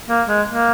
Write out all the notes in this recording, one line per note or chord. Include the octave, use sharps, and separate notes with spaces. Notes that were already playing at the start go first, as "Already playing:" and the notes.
A#3
G#3
A#3